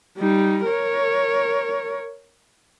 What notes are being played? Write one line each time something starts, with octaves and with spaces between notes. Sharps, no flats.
G3 D#4
A#4 C#5